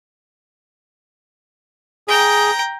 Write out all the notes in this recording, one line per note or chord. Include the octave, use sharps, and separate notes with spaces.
G#4 G5 A#5